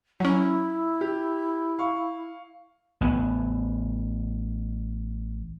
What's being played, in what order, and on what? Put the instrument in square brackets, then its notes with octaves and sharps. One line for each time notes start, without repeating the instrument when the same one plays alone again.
[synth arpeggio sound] F#3 C#4 [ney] E4
[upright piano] G4
F5 C#6
[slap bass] A1 B3